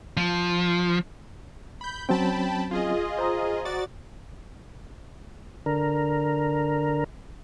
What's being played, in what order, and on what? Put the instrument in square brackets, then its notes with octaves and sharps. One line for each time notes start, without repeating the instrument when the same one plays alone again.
[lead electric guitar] F3
[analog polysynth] B5 G6
[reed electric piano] F#3 C4 C#4 [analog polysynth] G5 A5 B5
[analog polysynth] F4 G#4 D#5
[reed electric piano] C5 A#5 D#6
[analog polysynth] F#4 D5 A6
[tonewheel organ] D3 A#4